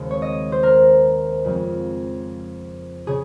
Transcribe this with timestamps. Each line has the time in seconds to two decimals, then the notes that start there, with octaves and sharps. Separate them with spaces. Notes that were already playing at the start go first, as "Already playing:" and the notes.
Already playing: D#2 C#3 G#3 C4
0.11 C#5
0.22 D#5
0.52 C5
0.63 A#4
1.44 F2 C#3 F3 G#3 C4
3.07 C#3 G#4